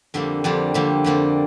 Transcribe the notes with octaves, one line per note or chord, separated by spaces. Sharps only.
F2 D3 G3 A#3
F2 D3 G3 A#3
F2 D3 G3 A#3
F2 D3 G3 A#3